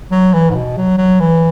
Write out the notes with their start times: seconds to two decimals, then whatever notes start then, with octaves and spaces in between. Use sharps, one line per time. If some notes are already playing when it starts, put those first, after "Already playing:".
0.11 F#3
0.34 E3
0.50 G#2
0.55 B2
0.77 F#3
0.98 F#3
1.20 E3